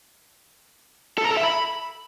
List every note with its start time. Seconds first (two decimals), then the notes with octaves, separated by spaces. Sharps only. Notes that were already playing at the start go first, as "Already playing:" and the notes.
1.18 A4
1.24 A#5
1.31 A4
1.37 E5
1.43 B5